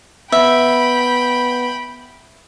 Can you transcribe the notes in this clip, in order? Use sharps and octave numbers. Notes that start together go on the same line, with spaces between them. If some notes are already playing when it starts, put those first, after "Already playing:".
B3 B4 E5 F#5 G5 B5